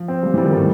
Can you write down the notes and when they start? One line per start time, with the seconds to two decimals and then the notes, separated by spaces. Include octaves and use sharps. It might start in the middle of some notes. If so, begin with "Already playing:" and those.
Already playing: F3
0.08 C4
0.23 F3 G3
0.34 E3
0.38 G3
0.45 D#3
0.52 A2 G3